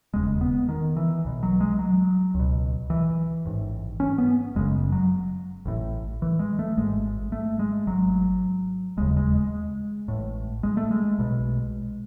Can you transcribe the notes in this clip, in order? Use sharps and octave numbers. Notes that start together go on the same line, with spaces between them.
E1 D#2 C#3 G#3
B3
D#3
E3
B1 B2
F#3
G#3
F#3
C#2
B2
E3
A1 G#2
C#4
B3
F#1 F#2 C#3 G#3
F#3
A1 A2
E3
G#3
A3
G#1 G#2 G#3
A3
G#3
G#1 G#2 F#3
E1 D#2 C#3 G#3
G#3
G#3
A1 A2
G#3
A3
G#3
B1 B2